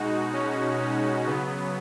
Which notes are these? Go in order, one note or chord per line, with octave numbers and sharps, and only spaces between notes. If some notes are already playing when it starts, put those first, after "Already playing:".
Already playing: B2 G#3 D#4 F#4
C#4
C#4
C#3 F#3 B3